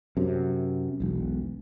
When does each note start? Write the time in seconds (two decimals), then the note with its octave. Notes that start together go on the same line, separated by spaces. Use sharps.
0.17 F#2 C3
1.00 E1 B1